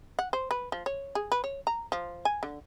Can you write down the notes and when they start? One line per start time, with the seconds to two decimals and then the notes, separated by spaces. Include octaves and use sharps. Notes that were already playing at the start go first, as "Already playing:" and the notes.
0.19 F#5
0.33 C5
0.51 B4
0.72 F3
0.86 C#5
1.15 G#4
1.32 B4
1.44 C#5
1.67 A#5
1.92 F3
2.25 G#5
2.43 D3